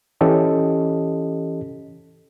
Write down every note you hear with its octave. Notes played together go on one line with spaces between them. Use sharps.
E3 C#4 G4 A4 D#5